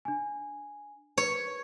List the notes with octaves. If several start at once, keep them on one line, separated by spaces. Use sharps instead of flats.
D4 G#5
B4 C#5